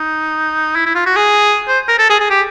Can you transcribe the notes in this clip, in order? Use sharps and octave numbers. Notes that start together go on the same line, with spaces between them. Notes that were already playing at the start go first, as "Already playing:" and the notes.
Already playing: D#4
E4
E4
F4
F#4
G#4
C5
A#4
A4
G#4
G#4
G4